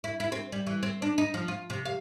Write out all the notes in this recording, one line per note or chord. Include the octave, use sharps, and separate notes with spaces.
E4
E4
C4
G3
E3
C4
D4
D#4
F3
F4
C3
F5